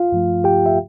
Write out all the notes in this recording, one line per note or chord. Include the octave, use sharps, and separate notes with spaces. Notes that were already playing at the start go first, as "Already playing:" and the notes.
Already playing: F4 F5
G2 F3 A3
G4 G5
E5